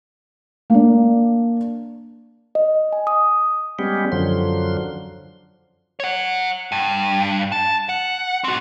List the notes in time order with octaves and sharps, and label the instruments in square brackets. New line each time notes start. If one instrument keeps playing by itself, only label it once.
[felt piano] A#3 D4
[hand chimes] D#5
G#5
D#6
[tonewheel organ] G3 G#3 B3 C#4 G4
F#2 D3 F3 F#3 C6
[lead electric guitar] C#5 F#5
G2
A5
F#5
C4 F#4